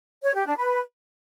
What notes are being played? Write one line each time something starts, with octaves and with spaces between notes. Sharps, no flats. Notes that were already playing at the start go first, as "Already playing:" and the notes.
C#5
G4
D4
B4